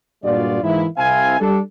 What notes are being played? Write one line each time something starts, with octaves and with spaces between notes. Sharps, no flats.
G2 A#2 G#3 F4 F#4 D5
G#2 E3 G#3 A#3 E4
C2 C3 C4 E4 F5 G#5
G3 D4 A4